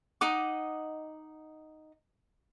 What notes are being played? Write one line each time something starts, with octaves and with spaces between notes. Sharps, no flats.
D#4 D#5 F#5 D6